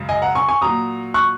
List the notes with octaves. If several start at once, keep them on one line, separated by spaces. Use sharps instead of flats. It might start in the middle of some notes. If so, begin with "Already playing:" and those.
Already playing: F#2 C#3 G#3
D#5 G#5
F#5 A#5
G#5 C#6
G#5 C#6
A#2 F#3 A#5 D#6
C#6 F#6